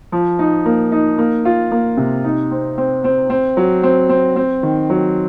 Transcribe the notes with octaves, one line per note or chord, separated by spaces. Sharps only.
F3
D#4
A#3
D#4
A#3
F4
A#3
C3
D#4
C4
C4
C4
C4
F#3
C4
C4
C4
D#3
F#3